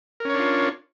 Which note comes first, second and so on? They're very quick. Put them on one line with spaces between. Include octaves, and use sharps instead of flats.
A#4 C#4 C#5 D4 F4